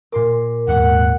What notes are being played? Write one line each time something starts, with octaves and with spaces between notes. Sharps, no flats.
A#2 A#4 C6 D6
D#2 G#2 B3 F#5